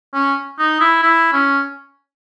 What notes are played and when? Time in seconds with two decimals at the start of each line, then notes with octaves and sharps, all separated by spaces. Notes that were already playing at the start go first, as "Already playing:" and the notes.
0.14 C#4
0.59 D#4
0.80 E4
1.03 E4
1.33 C#4